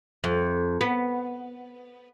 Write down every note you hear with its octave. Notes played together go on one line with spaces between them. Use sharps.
F2
B3